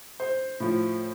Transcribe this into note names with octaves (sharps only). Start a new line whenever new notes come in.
C5
A2 F3